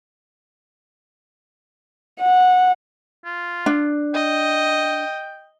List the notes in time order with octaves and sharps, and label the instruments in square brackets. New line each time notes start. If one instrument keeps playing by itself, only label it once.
[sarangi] F#5
[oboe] F4
[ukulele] D4
[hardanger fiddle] D#5 [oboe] G5